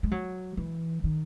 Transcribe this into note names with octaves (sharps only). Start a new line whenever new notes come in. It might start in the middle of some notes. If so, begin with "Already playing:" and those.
G#3
F#3
E3
D#3